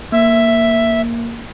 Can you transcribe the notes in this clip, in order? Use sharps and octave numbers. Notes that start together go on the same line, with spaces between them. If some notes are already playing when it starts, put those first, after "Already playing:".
A#3 E5